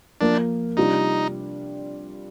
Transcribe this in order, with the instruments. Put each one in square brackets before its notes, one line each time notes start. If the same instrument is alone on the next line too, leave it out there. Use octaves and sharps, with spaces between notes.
[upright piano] F3 A#3 F4 A#4 [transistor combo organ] D4
[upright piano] C3 G3 D4 F4 [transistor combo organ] D#4